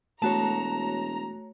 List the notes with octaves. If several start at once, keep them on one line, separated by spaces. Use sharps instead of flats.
E1 A3 F#4 C#5 A5 A#5